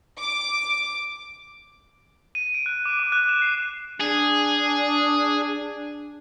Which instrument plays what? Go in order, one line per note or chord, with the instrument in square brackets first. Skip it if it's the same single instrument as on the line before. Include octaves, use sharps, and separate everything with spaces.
[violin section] D6
[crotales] D#7
D7
F#6
D6
D6
F#6
E7
C7
[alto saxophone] D4 [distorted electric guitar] G#4